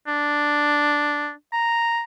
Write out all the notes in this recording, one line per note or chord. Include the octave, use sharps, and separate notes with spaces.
D4
A#5